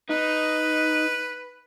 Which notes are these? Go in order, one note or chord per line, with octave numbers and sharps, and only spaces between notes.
D#4 B4